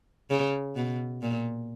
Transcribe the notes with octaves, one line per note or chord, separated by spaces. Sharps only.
C#3
B2
A#2